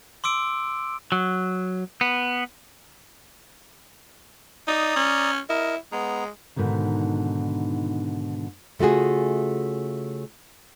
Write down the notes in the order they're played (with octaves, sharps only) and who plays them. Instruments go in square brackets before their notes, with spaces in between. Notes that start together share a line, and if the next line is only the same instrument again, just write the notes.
[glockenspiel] C6 D6 E6 D7
[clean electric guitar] F#3
B3
[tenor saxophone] D#4 [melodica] D5 A#5 D#6
[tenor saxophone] C#4
[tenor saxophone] E4 [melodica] A#4 D#5
[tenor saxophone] G#3 [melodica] B3 A#5
[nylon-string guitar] G#2 B2 D3 D#3
C#3 A3 F4 F#4 G#4